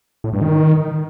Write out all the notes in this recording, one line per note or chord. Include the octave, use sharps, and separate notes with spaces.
A2
G2
D#3